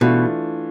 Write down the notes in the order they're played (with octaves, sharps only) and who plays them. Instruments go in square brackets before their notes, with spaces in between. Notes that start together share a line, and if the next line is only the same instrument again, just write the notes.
[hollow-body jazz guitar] B2 [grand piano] E3 A3 D4 F4